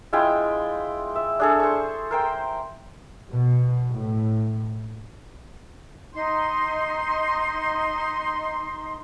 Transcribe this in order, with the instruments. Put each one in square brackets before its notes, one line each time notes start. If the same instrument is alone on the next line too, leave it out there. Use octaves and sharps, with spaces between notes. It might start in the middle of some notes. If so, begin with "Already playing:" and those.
[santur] G#3 E4 F4 G5
E5
D4 G#4 A4
C5 C#6
A#4 C5 G5
[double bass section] B2
A2
[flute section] D#4 C6